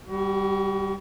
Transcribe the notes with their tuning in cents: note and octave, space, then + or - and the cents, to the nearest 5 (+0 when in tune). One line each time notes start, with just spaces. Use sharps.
G3 +0 F#4 +40